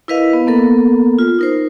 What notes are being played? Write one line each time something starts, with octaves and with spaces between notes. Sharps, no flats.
E4 A#4 B4 D#5 F5
B3
A#3 B3 A4 A#4
F4
D#4 A#4 C5